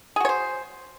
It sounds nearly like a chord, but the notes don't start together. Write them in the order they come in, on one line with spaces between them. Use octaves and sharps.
G#4 F#4 C#5 C5